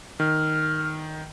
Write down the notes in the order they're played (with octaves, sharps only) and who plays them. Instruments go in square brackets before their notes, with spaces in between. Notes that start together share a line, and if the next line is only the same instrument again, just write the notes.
[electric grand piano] D#3 [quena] F6